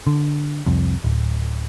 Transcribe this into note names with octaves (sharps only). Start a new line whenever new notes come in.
D3
C2 F2
D1